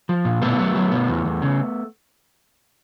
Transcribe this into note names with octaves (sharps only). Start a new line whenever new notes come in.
F3
A#2
B2 A3 B3
F#3
F#3
B2
E2
E2
C#3